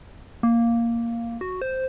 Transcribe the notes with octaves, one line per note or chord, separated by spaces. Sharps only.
A#3
F#4
C5